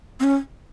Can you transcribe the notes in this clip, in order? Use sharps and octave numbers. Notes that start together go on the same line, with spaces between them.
C4
C#4